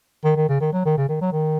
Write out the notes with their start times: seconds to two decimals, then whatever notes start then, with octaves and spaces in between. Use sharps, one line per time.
0.24 D#3
0.36 D#3
0.49 C#3
0.61 D#3
0.73 F#3
0.85 D#3
0.97 C#3
1.09 D#3
1.21 F#3
1.32 D#3